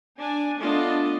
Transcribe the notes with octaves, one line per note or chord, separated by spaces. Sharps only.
D4 G#5
A3 B3 D4 F4 D#5